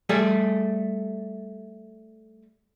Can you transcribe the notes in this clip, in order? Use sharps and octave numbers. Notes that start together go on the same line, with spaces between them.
G3 A3 G#4